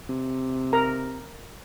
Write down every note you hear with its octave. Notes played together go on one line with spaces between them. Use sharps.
C3
A#4 A#5